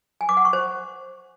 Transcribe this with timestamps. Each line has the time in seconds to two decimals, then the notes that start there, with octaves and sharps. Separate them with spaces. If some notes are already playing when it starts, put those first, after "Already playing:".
0.21 G#5
0.29 D6
0.37 F#5
0.45 C#6
0.53 C5